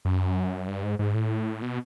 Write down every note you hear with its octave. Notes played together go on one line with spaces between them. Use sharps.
F#2
G2
G#2
G#2
A2
B2